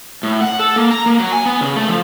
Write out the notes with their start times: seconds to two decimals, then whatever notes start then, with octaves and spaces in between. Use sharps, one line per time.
0.23 A2
0.41 F#5
0.59 A4
0.76 A#3
0.91 A#5
1.06 A#3
1.20 F#3
1.32 G#5
1.46 B3
1.61 C#3
1.76 A3
1.88 F3